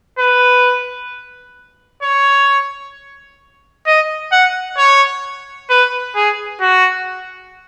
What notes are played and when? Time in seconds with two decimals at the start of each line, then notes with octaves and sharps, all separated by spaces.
0.19 B4
2.03 C#5
3.87 D#5
4.32 F#5
4.77 C#5
5.70 B4
6.15 G#4
6.61 F#4